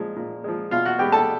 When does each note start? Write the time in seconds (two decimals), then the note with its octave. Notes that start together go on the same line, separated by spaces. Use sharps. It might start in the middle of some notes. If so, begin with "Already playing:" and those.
Already playing: A#2 F3 G#3
0.16 A#2
0.44 F3 G#3
0.71 B2 F4 F5
0.85 F#4 F#5
0.99 G#3 B3 G4 G5
1.12 A4 A5